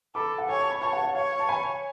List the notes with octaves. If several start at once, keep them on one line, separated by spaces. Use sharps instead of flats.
A4 B5 D6
F#5
C#5 G#5
A5
B5
C#5 A5 C#6
F#5 A5
F#5
C#5 F5
A5
G#5 B5